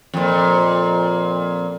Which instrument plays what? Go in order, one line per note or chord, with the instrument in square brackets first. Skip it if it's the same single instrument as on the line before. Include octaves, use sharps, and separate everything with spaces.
[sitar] F2 A#2